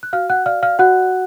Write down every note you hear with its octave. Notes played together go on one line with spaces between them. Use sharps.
F#6
F#4 F5 F6
F#5 F#6
D5 F5 F6
F5 F6
F#4 F#5 F#6